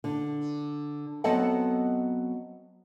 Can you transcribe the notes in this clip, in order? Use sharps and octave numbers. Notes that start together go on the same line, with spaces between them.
D3
F#3 B3 C4 A4 D#5 F#5